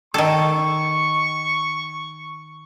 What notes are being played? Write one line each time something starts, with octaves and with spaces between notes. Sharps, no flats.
D#3 A4 C#6